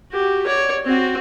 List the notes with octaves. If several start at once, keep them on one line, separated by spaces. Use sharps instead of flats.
F#4 G4
C#5 D5
C4 F#4